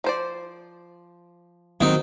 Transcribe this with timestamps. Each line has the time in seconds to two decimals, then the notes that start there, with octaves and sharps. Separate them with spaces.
0.04 F3 C5 D5
1.81 D#3 F#3 C4 D#4